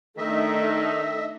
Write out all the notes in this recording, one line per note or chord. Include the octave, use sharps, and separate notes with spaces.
D#3 A3 D4 D#4 D#5 E5